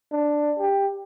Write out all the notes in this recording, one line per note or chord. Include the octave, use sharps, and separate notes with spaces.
D4
G4